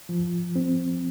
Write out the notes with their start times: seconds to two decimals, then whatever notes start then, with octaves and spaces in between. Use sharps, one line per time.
0.09 F3
0.56 C4